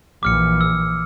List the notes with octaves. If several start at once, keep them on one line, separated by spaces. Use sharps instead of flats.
A#1 E3 D6 F6 C#7
E6